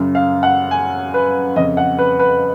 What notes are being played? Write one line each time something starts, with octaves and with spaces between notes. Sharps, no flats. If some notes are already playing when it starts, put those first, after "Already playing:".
Already playing: F#2 C#3
F5
F#5
G#5
B4
F2 C#3 D#5
F#5
B4
B4